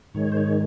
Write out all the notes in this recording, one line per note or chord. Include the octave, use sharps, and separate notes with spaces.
G#2 D#3 G#3 C#5
C5
C#5